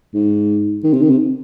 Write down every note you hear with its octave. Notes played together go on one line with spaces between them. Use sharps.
G#2
D#3
C3
D#3
C3